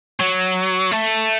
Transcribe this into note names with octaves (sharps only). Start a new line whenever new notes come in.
F#3
A3